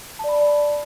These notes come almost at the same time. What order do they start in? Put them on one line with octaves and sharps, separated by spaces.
A5 D5 B5